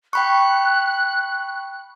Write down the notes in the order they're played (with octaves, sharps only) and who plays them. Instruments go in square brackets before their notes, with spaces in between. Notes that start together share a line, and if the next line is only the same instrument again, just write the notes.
[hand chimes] G5 B5 C#6 [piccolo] F#6